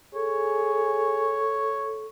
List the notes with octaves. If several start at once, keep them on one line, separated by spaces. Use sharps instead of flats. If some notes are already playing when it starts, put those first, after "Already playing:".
G#4 A4 C#5